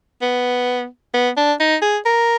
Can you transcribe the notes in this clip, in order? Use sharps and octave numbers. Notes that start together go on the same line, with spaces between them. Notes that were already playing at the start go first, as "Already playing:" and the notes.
B3
B3
D4
D#4
G#4
A#4